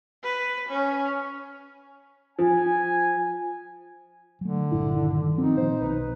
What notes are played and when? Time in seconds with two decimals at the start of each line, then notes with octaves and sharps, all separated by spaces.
0.24 B4
0.69 C#4
2.38 F3 G#5
4.41 D3 F#3 A3
4.71 A#1 G2 E4
4.95 D#3
5.38 F3 C4 D#4
5.57 A#2 D#3 C5
5.81 B1 B4